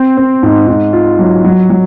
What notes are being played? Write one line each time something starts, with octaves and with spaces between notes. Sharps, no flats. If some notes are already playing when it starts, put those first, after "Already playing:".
Already playing: C4
C4
G#2
G#2
F4
F#3
F#3
F#3